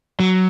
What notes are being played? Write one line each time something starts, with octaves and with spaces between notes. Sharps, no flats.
F#3